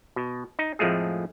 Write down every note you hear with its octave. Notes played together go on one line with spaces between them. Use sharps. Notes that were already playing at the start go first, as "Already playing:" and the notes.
B2
D#4
F2 A2 F3 G#3 A3 G#4